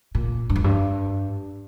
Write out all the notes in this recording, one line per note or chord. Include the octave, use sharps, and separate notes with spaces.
A#2
G2
F2
G2